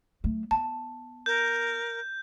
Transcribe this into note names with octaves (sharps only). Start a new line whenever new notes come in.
F#3 A3
B3 A5
A#4 G6